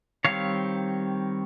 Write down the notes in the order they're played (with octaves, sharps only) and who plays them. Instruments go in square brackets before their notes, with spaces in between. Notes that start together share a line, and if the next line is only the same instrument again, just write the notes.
[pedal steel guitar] D#3 G3 C4 C#5 F5